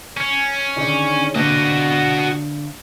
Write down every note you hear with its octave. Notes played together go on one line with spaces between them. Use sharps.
C#4
D3 D#3 G#4
D3 A#3 C4 F#4 D#5